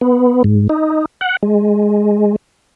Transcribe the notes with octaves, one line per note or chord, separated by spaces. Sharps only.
B3
G#2
D#4
F#5
G#3